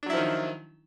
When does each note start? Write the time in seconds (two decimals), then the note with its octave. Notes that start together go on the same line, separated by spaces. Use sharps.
0.03 D4
0.06 F#3
0.10 E4
0.13 F3
0.17 D#3